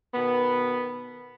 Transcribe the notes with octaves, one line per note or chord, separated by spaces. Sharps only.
B2 D#3 B3